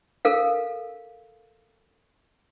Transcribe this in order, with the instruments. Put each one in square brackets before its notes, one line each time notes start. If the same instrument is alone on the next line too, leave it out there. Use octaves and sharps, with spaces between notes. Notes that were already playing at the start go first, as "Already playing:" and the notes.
[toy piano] A4 A#4 F5